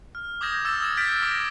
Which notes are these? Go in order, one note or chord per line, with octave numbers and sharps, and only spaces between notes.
F6
D6 D#6 G6 G#6 A#6 E7
D6 E6 G#6 A6 E7
D#6 G#6 E7
E6 F6 G6 A6 B6 D7
D6 A#6 D7 E7